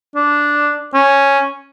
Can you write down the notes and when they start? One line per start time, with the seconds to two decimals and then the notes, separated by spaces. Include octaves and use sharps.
0.15 D4
0.94 C#4